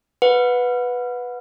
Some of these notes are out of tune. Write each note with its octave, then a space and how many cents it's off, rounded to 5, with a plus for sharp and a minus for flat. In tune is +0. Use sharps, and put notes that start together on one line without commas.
B4 +0 F#5 -30